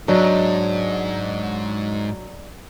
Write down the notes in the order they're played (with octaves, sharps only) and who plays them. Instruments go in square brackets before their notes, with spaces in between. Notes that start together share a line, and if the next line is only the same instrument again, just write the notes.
[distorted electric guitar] G#2 [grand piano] F#3 [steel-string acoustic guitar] D4 D#5